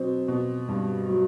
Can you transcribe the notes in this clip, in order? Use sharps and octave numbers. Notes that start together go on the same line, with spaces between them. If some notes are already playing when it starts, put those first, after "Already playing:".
Already playing: B2 F#3 C4
B2
G2
F#3